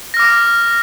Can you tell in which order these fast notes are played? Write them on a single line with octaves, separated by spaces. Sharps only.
A#6 F6 D6